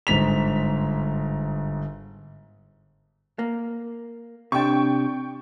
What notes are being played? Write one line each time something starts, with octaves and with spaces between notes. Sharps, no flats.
G1 G#2 B6 F7
A#3
C3 D4 G5 C#6